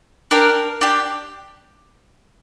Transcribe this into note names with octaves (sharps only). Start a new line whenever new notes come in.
D4 G4 A#4
D4 G4